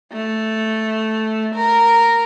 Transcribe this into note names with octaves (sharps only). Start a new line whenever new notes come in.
A3
A#4